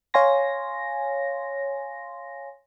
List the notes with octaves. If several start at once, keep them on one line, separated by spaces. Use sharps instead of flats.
C#5 F5 G#5 C6 A#6